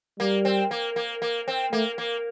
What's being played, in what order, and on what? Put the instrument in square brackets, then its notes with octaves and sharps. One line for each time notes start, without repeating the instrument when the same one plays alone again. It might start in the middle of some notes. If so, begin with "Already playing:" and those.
[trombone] G3 [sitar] A#3
[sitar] C4
A#3
A#3
A#3
C4
[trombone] A3 [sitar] A#3
[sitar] A#3